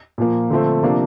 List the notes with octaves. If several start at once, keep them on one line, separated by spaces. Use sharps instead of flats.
A#2 F3 A#3
D3 F3 A3 C4
C3 F3 A#3 D4